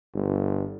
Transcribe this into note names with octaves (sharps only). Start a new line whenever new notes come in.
G1